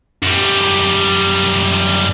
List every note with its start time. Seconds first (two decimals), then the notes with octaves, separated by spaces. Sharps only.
0.23 F#2 G3